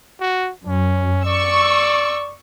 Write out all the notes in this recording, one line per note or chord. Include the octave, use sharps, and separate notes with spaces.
F#4
F#2 C#4
D5 C#6 E6